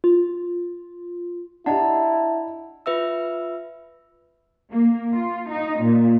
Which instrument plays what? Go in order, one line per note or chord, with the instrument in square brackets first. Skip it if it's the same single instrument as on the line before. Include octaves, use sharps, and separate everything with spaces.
[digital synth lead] F4
[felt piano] D4 G4 [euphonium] E4 [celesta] D#5 F#5 [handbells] A5 A#5
[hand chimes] F4 B4 E5 E6
[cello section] A#3
F4
D#4
A#2